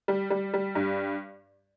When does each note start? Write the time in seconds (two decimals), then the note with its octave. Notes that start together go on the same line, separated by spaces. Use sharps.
0.08 G3
0.30 G3
0.54 G3
0.75 G2